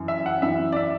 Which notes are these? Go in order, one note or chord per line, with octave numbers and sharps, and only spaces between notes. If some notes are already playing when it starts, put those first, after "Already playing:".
Already playing: F#2 E3
E5
F#5
F#2 E3 E5
D5
E5